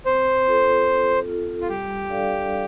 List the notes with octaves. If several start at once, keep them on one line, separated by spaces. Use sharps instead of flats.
C4 C5
F4 A4
C4
F4 A4
F4
G3 G4
D4 A4 D5 F5
G3